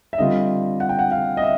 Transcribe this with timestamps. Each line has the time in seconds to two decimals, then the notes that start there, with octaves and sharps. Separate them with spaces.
0.13 E5
0.18 D3 G3 C4 F4 D#5
0.80 F#5
0.89 G5
0.99 F#5
1.12 F5
1.37 D#5
1.42 E5